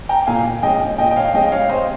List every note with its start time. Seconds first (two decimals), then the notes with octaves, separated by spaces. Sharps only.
0.09 G5 A#5
0.27 A#2 F5 G#5
0.63 G#3 C#4 D#5 G5
0.98 A#2 D#5 G5
1.11 G5
1.16 C#5 F5
1.34 G#3 C#4 D#5 G5
1.52 C#5 F5
1.69 C3 C5 D#5